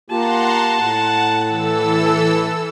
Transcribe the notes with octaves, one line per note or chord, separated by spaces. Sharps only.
A#3 F4 G4 F#5 A5 A#5 C6
A2 F#5
E3 A4 E6